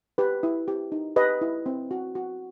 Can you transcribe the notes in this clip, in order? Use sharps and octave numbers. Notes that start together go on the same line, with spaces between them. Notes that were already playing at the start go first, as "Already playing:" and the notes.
G4 B4
E4
G4
D#4
G4 B4 D#5
E4
C4
F#4
F#4